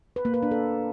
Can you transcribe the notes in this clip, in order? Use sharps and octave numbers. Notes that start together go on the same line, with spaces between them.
B4
A#3
B4
D4
A4